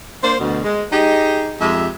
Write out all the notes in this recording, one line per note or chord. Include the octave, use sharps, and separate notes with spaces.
A#3 D4 C5
D2 B2
G#3
D#4 G4 G#4 D#5
F2 G#3 G4 E5